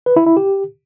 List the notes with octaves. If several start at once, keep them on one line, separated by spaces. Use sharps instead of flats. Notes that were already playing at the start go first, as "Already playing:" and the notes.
B4
E4
E4
G4